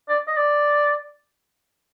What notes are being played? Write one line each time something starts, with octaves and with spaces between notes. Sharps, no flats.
D5
D#5
D5